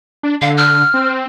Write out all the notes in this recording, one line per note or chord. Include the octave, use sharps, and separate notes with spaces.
D4
D3 F5
F6
C4